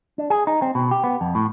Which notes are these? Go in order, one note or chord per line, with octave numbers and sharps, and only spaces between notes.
D4
G#4
D#4
C4
B2
G4
B3
F2
A2